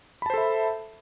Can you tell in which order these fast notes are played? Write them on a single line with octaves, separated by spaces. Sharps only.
B5 A5 C5 A4 E5